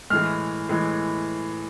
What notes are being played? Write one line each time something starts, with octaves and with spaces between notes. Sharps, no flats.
A2 E3 G#3 F6
A2 E3 G#3